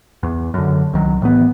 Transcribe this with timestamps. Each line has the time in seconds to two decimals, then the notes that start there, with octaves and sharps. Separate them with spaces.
0.23 E2
0.54 F#2 D3
0.93 C2 D#3 F#3
1.22 A2 E3 B3